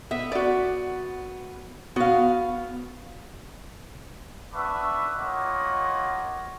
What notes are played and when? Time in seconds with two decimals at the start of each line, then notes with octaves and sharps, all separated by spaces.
0.11 B3 E5
0.32 F#4 D5
1.96 B3 F#4 F5
4.54 B3 D4 B4 E5 C#6
5.17 A#3 F4 C#5 D#5 F#5